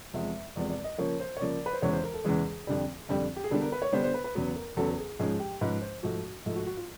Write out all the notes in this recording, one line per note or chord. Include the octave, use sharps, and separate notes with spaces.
E2 C3 F3 G#3 E5
E2 C3 F3 G#3 D5
D5
D#5
C#3 F3 A#3 C#5
C5
C#5
C#3 F3 A#3 D5
B4
C5
E2 C#3 E3 G#3 C#5
C5
A#4
A4
E2 C#3 E3 G#3 G#4
F2 D3 G3
F2 D3 G3
G4
G#4
D3 G3 B3 D4 A4
A#4
B4
C#5
D3 G3 B3 D4 C5
C5
B4
B4
E2 C#3 F#3 B3
A#4
E2 C#3 F#3 B3 A4
A4
G#4
G#2 F3 G#3 C#4 G#4
G4
G#2 F3 G#3 C#4 B4
C5
G#2 F3 A3 F#4
G#2 F3 A3
F#4
F#4
F4